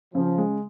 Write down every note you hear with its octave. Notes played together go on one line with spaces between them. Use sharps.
C#3 F3
G#3